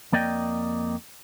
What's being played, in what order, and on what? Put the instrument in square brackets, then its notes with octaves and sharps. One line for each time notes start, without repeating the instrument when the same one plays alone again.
[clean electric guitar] F2 A#3 D5 D#5 G5